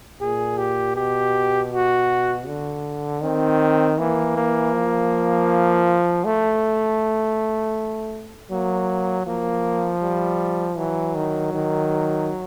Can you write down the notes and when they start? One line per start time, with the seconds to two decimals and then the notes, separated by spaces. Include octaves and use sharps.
0.21 A#2 G#4
0.58 G4
0.96 B2 G4
1.72 F#4
2.47 D3
3.22 D#3 C4
3.98 E3 A#3
4.36 A#3
4.73 F3
6.25 A3
8.51 F#3 A#3
9.27 F3 A#3
10.02 G3
10.77 E3 F#3
11.16 D#3
11.54 D#3